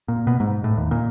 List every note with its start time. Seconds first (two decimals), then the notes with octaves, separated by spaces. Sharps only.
0.08 A#2
0.27 B2
0.40 G#2
0.64 A2
0.77 D#2
0.91 A#2